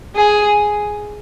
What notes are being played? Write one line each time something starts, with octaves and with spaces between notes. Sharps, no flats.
G#4